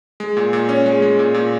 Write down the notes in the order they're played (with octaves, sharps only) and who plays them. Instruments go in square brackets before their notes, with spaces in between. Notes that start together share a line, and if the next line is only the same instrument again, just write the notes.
[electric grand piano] G#3
A#2
A#2
C#4
G#3
G#3
A#2
A#2